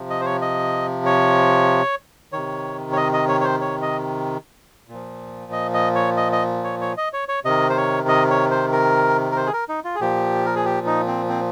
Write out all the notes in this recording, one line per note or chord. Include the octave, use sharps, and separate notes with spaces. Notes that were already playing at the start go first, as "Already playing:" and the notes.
Already playing: C3 F3
D#5
C5
C#5
D#5
C#5
C3 D#3 C#5
C#5
D#5
D#5
C#5
C#5
C5
C#5
D#5
A#2 F3
D#5
D#5
C#5
D#5
D#5
C#5
C#5
D#5
C#5
C#5
C3 D#3 D#5
C5
C#5
D#5
C#5
C5
A#4
A#4
C5
G#4
A#4
D#4
F4
G#4
A#2 F3 G4
A#4
G#4
G4
D#4
C4
C4